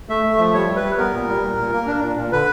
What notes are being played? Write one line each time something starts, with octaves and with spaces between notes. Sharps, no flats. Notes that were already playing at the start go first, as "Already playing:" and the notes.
A3 E5
A3
F3
G3 C#5
G3
B4
G3
B3 A#4
A#2
G3
A#2
A#2
A#3
D4
A#2
A#2
D3 B4